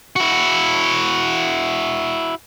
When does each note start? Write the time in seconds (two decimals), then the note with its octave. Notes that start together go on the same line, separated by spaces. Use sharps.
0.16 E4 F#4